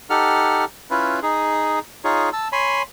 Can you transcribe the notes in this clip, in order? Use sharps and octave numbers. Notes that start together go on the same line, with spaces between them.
D#4 G4 A4 F#5 F6
C#4 E4 F4 B4
D#4 G#4
D#4 F4 G#4 C#5
A5 E6
C#5 G#5 B5 C6